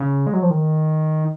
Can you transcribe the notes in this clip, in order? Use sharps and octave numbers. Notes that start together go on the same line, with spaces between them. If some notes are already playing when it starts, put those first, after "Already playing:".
Already playing: C#3
G#3
F#3
F3
D#3